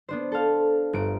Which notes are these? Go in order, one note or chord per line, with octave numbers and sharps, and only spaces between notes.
B3 D4 C5
A4 C5 F5
G1 D7